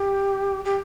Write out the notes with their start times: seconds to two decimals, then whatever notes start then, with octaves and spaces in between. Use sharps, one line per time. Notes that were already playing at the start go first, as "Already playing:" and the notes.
Already playing: G4
0.65 G4